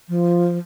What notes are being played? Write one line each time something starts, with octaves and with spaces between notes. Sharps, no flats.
F3